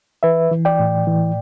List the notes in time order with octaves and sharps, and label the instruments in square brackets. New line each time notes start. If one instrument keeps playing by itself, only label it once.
[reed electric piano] E3 B4 E5
E3
D5 G5
A2
E3